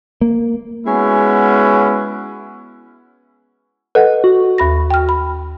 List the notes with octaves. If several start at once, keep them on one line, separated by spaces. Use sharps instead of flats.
A#3
G#3 B3 C#4 E4 F#4
A4 B4 D#5 F#5
F#4
D#2 B5 A#6
G5 F6
B5